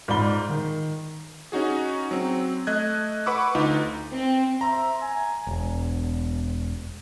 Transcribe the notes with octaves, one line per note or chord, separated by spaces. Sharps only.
G#2 F4 D5 B5 G7
D#3
C#4 D#4 F#4 G#4
F#3 C4
A3 D#5 F#6 G#6
B4 F#5 B5 C#6 D6 E6
D2 D#4 F4
C4
C5 E5 A#5
G#5
E1